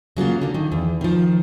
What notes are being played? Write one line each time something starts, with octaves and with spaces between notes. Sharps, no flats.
C#3 F#3 A#3 F4
D3 D4
D#3
E2
D#3 F3